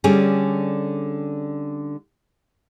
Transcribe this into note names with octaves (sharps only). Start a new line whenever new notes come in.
D3 G3 C#4 G#4